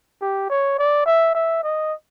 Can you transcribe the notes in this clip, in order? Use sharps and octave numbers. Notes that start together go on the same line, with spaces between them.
G4
C#5
D5
E5
E5
D#5